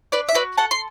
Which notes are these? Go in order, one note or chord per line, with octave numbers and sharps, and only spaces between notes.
D4 B4 D5
E5
F#4 B4 D5
A4 F#5 A5
C6